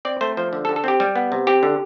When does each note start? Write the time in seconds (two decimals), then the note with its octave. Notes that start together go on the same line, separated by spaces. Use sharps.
0.05 C4 D5
0.21 A3 C5
0.37 F3 C5
0.53 D3
0.65 A4
0.69 D3
0.76 A4
0.84 C4 G4
1.00 G3
1.16 B3
1.32 C3
1.47 C4 G4
1.63 D3